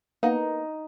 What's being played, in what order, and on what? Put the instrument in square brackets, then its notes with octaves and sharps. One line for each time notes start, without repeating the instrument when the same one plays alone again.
[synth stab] A#3 B3 [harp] D#4